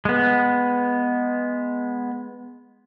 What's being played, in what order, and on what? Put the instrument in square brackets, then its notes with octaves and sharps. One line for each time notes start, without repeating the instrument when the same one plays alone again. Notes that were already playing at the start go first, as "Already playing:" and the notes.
[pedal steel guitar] G#3 B3